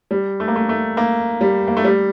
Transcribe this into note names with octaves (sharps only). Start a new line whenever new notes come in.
G3
A3
A#3
A3
A3
A#3
G3
A#3
A3
G3